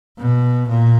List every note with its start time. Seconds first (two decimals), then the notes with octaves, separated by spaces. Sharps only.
0.18 B2
0.69 A#2